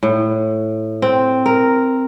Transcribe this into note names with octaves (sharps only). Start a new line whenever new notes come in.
A2
C4
A#4